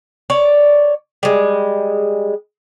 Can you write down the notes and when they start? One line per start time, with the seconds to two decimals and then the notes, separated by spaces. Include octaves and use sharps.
0.30 C#5 D5
1.23 G3 G#3